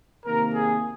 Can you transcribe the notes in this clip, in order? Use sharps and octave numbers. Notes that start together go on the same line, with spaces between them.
C3 D#3 A#3 A#4
G#4